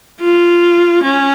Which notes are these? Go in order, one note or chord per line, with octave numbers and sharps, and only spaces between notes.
F4
C#4